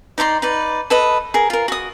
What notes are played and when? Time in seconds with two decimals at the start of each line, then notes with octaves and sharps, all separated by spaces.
0.18 D#4 D5 A#5 C6
0.42 D#4 B4 D5
0.90 A4 B4 D#5
1.34 G#4 A#4
1.50 F4 A#4
1.68 F#4 D#6